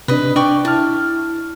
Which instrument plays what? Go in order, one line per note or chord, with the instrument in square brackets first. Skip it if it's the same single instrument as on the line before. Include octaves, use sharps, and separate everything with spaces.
[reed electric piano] C3 D4 [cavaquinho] B4 D#5
[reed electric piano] D4 [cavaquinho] D5 G5 C#6
[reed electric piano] E4 F6 [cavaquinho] A5